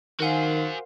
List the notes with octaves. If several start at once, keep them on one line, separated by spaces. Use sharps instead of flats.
D#3 F#4 A#4 C5 F5 F#5 G#5